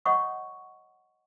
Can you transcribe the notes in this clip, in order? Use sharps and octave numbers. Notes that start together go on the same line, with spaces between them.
C#5 D#5 F#5 B5 C#6 D#6